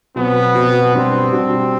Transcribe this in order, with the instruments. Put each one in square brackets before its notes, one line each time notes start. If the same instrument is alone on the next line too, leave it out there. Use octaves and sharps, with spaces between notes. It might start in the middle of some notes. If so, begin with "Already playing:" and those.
[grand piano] B2 F#3 C4 F#4 [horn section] B3
[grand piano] B2 F#3 C4 F#4
[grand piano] B2 G3 D4 F#4 [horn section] C4
[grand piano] B2 G3 D4 F#4